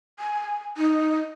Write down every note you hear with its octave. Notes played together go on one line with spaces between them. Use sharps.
G#5
D#4